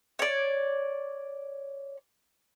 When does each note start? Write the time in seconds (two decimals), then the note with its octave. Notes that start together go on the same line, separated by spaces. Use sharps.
0.19 C#5 D5